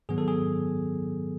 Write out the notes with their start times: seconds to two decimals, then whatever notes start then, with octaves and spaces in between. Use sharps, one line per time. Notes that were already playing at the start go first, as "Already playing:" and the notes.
0.09 G#2 D#3 F#3 B3 G#4
0.18 A4
0.28 G#4